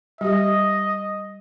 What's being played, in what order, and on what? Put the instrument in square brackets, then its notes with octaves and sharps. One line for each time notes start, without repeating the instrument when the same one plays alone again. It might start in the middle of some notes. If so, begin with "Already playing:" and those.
[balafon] G3 G4 [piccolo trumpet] D#5